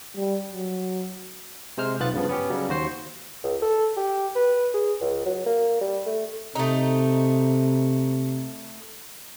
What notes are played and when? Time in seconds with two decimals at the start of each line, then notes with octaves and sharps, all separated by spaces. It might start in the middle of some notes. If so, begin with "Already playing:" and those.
0.17 G3
0.52 F#3
1.78 C3 G#3 C5 F6
2.00 B1 B3 F4 F#6 A6
2.14 G2 C#3 F3 B3
2.29 B3 C#4 G4
2.50 C#3 F#3 G3
2.69 D#2 F#4 C5 C7
3.44 C#2
3.62 A4
3.97 G4
4.36 B4
4.74 G#4
5.01 C#2
5.26 F#3
5.46 A#3
5.81 G3
6.06 A3
6.55 C3 A3 D#4